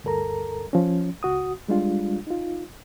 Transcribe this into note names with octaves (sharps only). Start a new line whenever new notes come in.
D2 G2 A4 A#4 A#5
F3 C#4
C#2 F#4 D#6
G3 G#3 D4 F4
D#4 F4